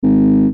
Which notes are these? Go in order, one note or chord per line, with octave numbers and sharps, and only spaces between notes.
G#1